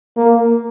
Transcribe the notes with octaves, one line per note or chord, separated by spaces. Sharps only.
A#3